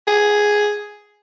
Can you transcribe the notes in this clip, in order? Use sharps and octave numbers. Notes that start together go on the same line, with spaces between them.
G#4